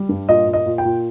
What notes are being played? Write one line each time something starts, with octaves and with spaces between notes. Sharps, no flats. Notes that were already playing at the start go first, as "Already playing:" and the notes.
Already playing: G3
G2
A#2 D#5
A#2
D#5
A#2
G5
A#2